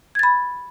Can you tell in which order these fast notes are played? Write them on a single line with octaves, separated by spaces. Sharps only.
G#6 A6 B5